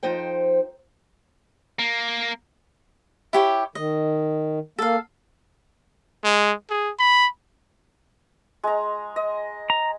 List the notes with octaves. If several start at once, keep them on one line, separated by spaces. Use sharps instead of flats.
F2 F3 D#4 C5 G5
A#3
E4 G4 C#5
D#3 D#5
A#3 A4 F5
G#3
G#4
B5
G#3 A#5
D#5
A#5